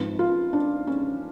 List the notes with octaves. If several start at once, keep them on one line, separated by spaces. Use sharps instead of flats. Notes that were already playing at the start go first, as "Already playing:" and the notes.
Already playing: G#1 G#2 F3 B4
F4
D4
C#4